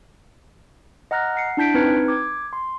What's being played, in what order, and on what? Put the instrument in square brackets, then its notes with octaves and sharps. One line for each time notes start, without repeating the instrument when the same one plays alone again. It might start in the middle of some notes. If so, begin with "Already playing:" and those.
[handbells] D#5 F#5 A#5 F6 F#6 A#6
F#5 C7 C#7
D4 E4 A5 G6 B6 D7
C4 D#4 B4 F6 G#6 C#7
D6 G#6
C6